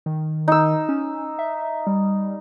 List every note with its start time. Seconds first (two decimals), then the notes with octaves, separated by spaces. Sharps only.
0.06 D#3
0.48 D#4 E6
0.89 C#4
1.39 E5
1.87 G3